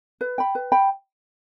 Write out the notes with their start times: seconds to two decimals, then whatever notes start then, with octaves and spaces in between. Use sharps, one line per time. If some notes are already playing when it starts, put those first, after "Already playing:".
0.21 B4
0.38 G5 B5
0.55 B4
0.72 G5 B5